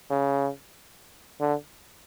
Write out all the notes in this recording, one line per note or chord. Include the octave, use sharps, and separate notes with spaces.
C#3
D3